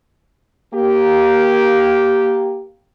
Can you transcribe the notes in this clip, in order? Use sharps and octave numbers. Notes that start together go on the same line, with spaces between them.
A#3 G4